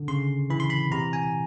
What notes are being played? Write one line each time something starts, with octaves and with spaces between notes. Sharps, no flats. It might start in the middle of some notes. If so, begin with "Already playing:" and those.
Already playing: D3
C#3 C6
E3 B5
C6
B5
C3 A#5
G#5